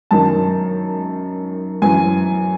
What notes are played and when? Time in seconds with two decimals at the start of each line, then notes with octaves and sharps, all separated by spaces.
0.11 F#2 D#3 A5
1.82 F#2 E3 G#5